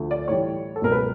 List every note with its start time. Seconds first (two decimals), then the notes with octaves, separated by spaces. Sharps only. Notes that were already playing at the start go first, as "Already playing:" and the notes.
Already playing: D2 D3 F3
0.11 D5
0.28 A2 E3 G3 C#5
0.76 A4
0.81 C#2 B2 F#3 A#4
0.92 B4